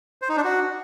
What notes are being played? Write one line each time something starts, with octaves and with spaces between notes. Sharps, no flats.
C5
D#4
D4
F#4